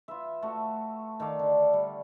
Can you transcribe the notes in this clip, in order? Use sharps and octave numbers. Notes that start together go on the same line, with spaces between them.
F4 B4 E5
A3 F#4
D#3 A4 D5 F5
D3
G3